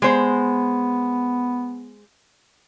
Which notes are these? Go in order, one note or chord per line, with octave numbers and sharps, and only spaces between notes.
G#3 B3 C5